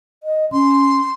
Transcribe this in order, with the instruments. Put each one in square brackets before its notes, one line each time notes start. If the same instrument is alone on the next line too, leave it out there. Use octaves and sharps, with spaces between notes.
[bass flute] D#5
[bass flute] C#4 [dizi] C6